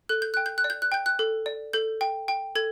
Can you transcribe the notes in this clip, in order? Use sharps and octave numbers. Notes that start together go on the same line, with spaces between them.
A4 F#6
G6
G5 F#6
G6
F#6
D5
G6
F#6
G5 G6
F#6
A4
D5
A4 G6
G5
G5
A4 G#6